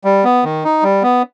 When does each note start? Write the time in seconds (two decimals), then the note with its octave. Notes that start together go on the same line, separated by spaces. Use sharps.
0.04 G3
0.24 B3
0.44 D#3
0.64 D#4
0.83 G3
1.02 B3